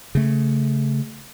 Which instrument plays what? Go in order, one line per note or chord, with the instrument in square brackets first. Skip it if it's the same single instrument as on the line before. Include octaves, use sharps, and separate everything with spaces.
[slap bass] C#3 A3